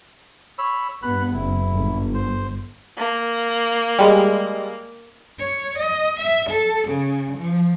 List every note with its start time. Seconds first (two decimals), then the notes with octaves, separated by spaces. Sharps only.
0.58 C#5 B5 E6
1.03 G2 B3 B5 F#6
1.34 F#1 E4
1.73 G1
2.14 C5
2.98 A#3
3.99 G3 G#3
5.39 C#5
5.78 D#5
6.19 E5
6.49 A4
6.87 C#3
7.36 F3